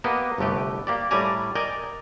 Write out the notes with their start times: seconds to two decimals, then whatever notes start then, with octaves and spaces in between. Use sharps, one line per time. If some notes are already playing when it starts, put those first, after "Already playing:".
0.04 A#3 B3 G4 B4 D#5
0.38 G1 C2 A3 G4 B4
0.87 A#3 G4 D5
1.11 A2 G3 G4 D5 G#5 A#5
1.55 A#4 D5 D#5 G5 G#5